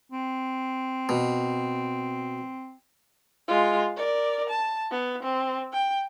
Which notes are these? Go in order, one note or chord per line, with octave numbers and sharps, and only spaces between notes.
C4
B2
G#3 F4
A#4 D5
A5
B3
C4
G5